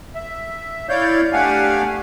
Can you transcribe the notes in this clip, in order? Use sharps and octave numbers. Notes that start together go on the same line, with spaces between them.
E5
E4 C#5 D5 F5 G6
A3 D4 G4 F5 F#5 G#5